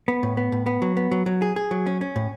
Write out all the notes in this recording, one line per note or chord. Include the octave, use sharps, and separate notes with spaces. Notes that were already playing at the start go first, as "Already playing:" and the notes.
B3
A2
B3
A2
B3
F#3
B3
F#3
F#3
G#4
G#4
F#3
C#4
C#4
A2